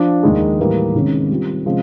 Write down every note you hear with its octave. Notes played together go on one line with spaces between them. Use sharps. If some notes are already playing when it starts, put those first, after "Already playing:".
Already playing: F3 D4
D#2 D#3 G#3
A2 E3 G3 A#3
C3 D#3 G#3 C#4
G3 C4 F4
C3 F3 G#3 C#4